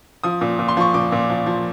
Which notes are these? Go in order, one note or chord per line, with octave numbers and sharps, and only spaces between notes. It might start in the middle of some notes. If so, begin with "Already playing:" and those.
F3 D#6
A#2
A#2
C6
F3 C#6
A#2 D6
A#2
F3
F3